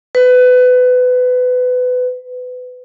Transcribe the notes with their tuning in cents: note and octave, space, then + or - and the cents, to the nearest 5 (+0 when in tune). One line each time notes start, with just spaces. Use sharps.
B4 +25